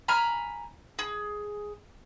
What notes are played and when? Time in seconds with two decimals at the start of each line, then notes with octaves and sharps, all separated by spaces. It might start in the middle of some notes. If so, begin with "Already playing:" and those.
0.08 G#5 A#5 B5 F6
0.99 G#4